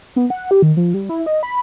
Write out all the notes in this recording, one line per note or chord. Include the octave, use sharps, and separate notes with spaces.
B3
F#5
G4
D#3
F3
G3
E4
D#5
B5